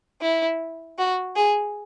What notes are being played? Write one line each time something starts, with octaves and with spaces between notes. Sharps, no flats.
E4
F#4
G#4